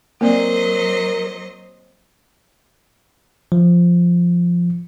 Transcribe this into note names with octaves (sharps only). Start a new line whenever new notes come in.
F#3 A#3 C4 A#4 C5 D5 D#5
F3